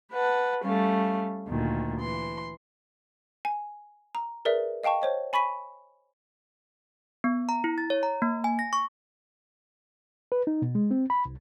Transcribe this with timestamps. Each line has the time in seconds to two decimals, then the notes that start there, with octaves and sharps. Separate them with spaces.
0.13 B4 F#5 A5
0.64 G3 A3 C#4 F5
1.48 D2 A#2 D#3
2.00 E3 C6
3.45 G#5
4.15 A#5
4.45 G#4 A#4 B4 D5 E5
4.83 D#5 F5 G5 A5 C#6
5.02 C5 C#5 D#5
5.33 G#5 B5 C#6 B6 D#7
7.24 B3
7.49 A#5
7.64 E4
7.78 A6
7.90 C#5
8.03 A#5
8.22 A#3
8.44 G#5
8.59 A#6
8.73 C#6
10.32 B4
10.47 D#4
10.62 B2
10.75 G#3
10.91 C4
11.10 B5
11.25 C2